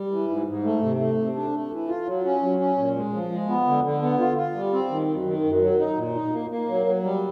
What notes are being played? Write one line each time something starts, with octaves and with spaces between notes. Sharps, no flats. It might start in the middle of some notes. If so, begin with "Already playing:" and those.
Already playing: G3
E3
G#2
G#2
A3
C3
A3
C3
D4
A3
E3
F4
F#3
C#4
F#3
C#4
A#2
G#3
F3
G#3
B3
D3
D3
B3
F4
F4
G3
C4
D#3
F#2
D#3
F#2
F#3
D#4
A#2
D#4
A#3
A#3
F#3
F#3
G3